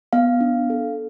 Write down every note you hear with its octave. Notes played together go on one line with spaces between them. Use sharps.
B3 F5
D4
A4